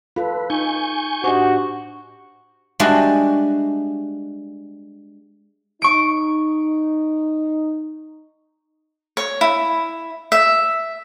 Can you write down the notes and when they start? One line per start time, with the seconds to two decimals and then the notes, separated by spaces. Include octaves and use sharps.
0.16 F4 A4 B4 F5
0.50 D#4 G#5 C#6 G6
1.24 A2 D4 F#4 G4 C5 D#5
2.80 G3 G#3 D4 F#4 E5
5.82 D#4 C#6 D7
9.17 C#5
9.41 E4
10.32 E5